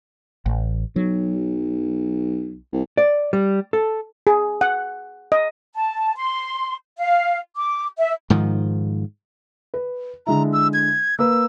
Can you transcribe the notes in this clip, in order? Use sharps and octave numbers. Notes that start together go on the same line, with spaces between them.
A1
B1 F#3
C2
D5
G3
A4
G#4
F#5
D#5
A5
C6
F5
D6
E5
G#2 D#3 F3
B4
D3 G#3 E4 A#5
E6
G#6
A#3 B4 E6